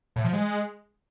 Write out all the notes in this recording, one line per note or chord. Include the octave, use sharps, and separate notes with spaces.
A2
F3
G#3